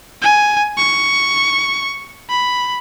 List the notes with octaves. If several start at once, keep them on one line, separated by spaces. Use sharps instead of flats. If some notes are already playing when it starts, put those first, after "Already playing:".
G#5
C#6
B5